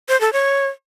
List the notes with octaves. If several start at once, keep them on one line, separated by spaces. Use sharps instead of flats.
C5
A4
C#5